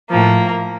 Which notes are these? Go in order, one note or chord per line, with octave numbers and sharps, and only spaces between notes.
A2 F3 A#3